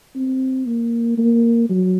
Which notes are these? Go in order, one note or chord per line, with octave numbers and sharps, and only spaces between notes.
C4
A#3
A#3
F#3